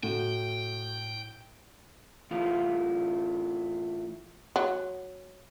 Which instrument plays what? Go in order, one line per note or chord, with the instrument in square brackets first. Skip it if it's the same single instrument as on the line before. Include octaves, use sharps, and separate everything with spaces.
[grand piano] A2 F#4 [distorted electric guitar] G5
[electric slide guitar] A2 E3 A3 E4 F4 F5
[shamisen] F#3